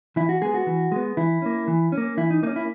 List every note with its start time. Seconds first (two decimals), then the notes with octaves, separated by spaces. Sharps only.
0.16 E3 E4
0.29 F#4
0.42 G#3 B3 G#4
0.54 F#4
0.67 E3
0.92 G#3 B3
1.17 E3 E4
1.42 A#3 C#4
1.68 E3
1.92 C#4
1.97 A#3
2.17 E3 E4
2.30 D#4
2.43 A#3 D#4
2.47 C#4
2.56 E4